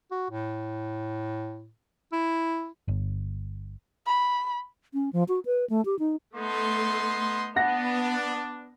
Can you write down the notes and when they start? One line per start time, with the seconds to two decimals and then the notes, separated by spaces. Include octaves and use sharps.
0.12 F#4
0.31 A2
2.13 E4
2.88 G1
4.07 B5
4.94 C#4
5.13 F3
5.29 F#4
5.45 B4
5.70 A3
5.85 G4
5.99 D#4
6.36 A3 B3 D#4 C6
7.56 B3 D4 F#5 A#6